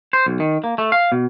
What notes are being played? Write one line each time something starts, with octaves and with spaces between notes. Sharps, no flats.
C5
B1
D#3
A#3
A3
F5
B2